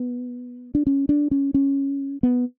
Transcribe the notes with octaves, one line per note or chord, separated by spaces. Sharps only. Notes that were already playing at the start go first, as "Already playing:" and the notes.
Already playing: B3
D4
C#4
D4
C#4
C#4
B3